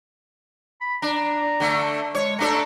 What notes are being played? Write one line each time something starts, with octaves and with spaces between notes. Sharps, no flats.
B5
D4 A#5
D3 A3
G#3 C#5
A3 D4 A4 A#5